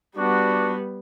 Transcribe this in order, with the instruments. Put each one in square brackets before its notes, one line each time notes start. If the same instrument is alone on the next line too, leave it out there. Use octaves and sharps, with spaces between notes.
[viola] G3 B3 [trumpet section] D4 F#4